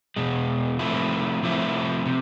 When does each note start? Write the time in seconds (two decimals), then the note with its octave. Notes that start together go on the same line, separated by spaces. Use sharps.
0.16 E2 B2 G#3
0.79 C3 F3 A3 E4
1.42 C3 F3 A3 E4
2.06 C3